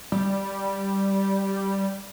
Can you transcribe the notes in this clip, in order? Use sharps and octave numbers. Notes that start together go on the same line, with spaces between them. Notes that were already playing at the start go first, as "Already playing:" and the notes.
G3